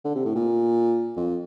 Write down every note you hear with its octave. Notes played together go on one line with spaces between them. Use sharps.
D3
C3
A2
A#2
F2